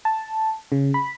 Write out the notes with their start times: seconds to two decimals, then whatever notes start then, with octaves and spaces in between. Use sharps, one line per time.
0.05 A5
0.72 C#3
0.94 B5